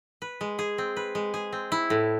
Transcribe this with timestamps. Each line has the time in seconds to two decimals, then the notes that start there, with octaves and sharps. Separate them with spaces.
0.22 B4
0.41 G#3
0.59 G#4
0.78 C4
0.97 B4
1.15 G#3
1.34 G#4
1.53 C4
1.72 E4
1.90 A2